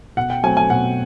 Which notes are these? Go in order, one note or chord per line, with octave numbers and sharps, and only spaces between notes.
B2 F#5
G5
F#3 A3 C4 G#5
G#5
B2 F#5